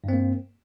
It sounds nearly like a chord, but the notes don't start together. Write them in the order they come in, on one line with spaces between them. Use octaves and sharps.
G2 C4 A#3